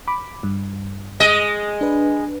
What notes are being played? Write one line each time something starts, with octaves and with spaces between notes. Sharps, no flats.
B5 D6
G2
G#3 D#5
D4 B4